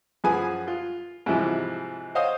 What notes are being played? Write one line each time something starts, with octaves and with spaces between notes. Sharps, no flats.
F#2 F3 G#4 B4 G#5
F4
G#2 C3 E3 F3 G3
C5 C#5 D#5 F5 D#6